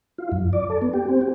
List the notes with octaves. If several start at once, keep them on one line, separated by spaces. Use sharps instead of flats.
F4
F#2
D5
A4
B3
G4
C4
G4